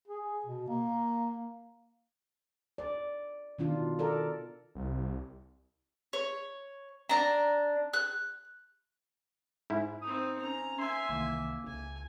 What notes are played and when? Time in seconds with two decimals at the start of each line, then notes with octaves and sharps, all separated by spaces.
0.08 G#4
0.46 B2
0.68 A#3
2.78 D5
3.59 B2 D#3 D4 F4
3.99 A4 A#4 D5
4.75 C2
6.13 C#5
7.09 D4 A#5
7.94 F#6
9.70 G#2 E4
10.02 C4 D#4 D#6
10.41 C#4 A#5
10.79 E5 G#5 C6
11.09 C2 D#3 E3 A#3
11.67 C#2 G#5